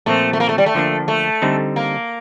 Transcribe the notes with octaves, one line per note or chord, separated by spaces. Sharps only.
A#2 F3 A3 C4
A3
A#3
A3
G3
A3
D3 F3 A#3 D4
A3
D3 G3 C4 D#4
A#3